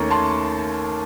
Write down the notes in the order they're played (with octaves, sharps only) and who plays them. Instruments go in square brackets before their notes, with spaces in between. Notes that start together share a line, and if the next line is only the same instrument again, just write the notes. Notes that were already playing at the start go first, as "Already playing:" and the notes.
Already playing: [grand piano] D#2 D#3 A3 C#4 A#5 C#6
A5 C6